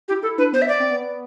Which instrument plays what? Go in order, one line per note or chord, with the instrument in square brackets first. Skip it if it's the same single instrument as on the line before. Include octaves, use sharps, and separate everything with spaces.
[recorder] G4
[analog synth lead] E4
[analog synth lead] E4 [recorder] A4
[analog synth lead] D4 [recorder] B4
[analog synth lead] B3 [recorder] C5
[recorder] E5
D5
[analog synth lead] C4
B3